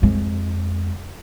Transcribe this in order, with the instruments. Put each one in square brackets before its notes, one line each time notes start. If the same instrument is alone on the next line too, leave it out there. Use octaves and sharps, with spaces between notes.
[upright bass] F2 G#3